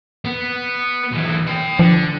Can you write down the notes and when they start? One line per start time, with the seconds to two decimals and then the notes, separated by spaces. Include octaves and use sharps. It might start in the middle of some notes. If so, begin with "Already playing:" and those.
0.25 B3
1.11 B1 E3
1.47 C#5 G5
1.79 D3 F3